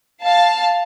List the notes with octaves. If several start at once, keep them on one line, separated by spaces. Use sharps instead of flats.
F5 A5